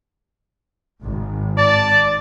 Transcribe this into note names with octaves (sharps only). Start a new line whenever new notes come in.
G#1
D5 A5